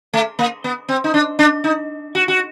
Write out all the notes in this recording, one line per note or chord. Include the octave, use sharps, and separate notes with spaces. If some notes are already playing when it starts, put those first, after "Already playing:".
A3
A#3
B3
C4
D#4
D4
D4
D#4
F#4
F#4